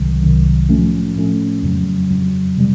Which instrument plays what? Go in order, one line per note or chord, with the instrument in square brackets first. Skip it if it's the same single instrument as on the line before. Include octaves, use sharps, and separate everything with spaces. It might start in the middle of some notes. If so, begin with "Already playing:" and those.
Already playing: [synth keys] C2 C3 D#3 F#3
C2 C3 D#3 F#3
A2 F3 A3 C#4
A2 F3 A3 C#4
F2 C#3 F#3
F2 C#3 F#3
C3 E3 G3